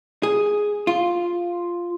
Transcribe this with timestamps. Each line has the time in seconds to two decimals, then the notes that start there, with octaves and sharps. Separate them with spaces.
0.23 G#4
0.87 F4